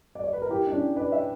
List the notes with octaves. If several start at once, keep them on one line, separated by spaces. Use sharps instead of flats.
D5
C#5
B4
A#4
E4 G4
D4
C#4 E4
B4 D5
C#5 E5